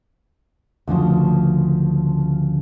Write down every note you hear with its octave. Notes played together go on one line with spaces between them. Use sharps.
D2 C#3 F3